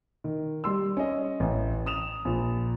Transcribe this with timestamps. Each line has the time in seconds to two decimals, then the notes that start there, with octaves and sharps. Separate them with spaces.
0.24 D#3
0.64 G3 C6 E6
0.97 C#4 D#5
1.40 A1
1.86 D#6 E7 F7
2.25 A#1